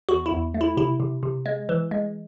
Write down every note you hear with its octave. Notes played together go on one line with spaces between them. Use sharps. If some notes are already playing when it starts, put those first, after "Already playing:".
E2 F#4
E4
E2
A3
E4
C3 E4
C3
C3
G#3
E3
G#3